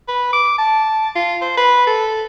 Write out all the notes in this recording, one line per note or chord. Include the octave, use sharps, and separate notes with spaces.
B4
D6
A5
F4
C5
B4
A4